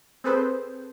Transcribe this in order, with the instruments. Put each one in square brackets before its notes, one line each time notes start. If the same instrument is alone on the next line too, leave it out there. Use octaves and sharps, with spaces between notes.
[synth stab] C4 G#4 A4 B4 C5